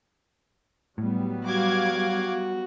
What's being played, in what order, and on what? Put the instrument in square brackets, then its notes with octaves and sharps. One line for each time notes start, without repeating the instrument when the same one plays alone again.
[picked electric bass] A2 [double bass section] F#3 G3 B3
[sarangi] F#4 [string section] F5 D6 G#6